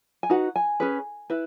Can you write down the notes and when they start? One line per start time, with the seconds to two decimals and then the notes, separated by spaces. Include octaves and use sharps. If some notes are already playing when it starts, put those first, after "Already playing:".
0.23 G#5
0.30 D#4 F#4 B4 F#5
0.56 G#5
0.80 C#4 G#4 B4
1.30 E4 B4